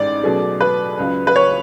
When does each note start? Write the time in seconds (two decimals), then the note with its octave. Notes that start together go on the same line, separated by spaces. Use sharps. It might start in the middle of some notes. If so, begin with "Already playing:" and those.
Already playing: A1 G#2 G#3 D5
0.23 B2 F#3 A3 C#4 G#4
0.61 B4
0.98 C#2 C#3 F#3
1.27 B4
1.36 C#5